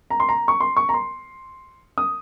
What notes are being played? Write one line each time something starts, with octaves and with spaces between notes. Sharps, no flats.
A#5
C6
A#5
C#6
C6
C#6
A#5
C6
D#6